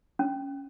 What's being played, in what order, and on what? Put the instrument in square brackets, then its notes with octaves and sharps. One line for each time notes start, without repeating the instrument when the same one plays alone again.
[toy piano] C#4